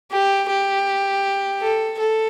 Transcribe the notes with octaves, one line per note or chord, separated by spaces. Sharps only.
G4
G4
A4
A4